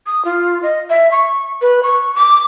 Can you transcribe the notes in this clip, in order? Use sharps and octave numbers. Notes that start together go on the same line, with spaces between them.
D#6
F4
D#5
E5
C#6
B4
C#6
D6